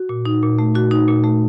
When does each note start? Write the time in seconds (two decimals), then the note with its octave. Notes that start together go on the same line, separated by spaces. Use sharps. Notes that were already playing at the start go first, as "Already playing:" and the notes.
Already playing: F#4
0.09 A#2
0.25 D#4
0.42 A#2
0.59 A3
0.75 A#2 F#4
0.91 D#4
1.08 A#2
1.24 A3